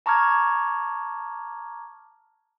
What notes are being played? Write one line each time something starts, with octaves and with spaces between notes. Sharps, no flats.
A5 A#5 C#6 D6 F6 G#6